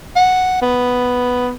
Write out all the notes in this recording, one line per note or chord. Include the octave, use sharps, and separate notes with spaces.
F#5
B3